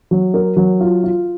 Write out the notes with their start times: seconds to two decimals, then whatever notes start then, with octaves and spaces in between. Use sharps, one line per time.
0.11 F#3
0.34 A#4
0.57 F#3
0.80 F4
1.04 F4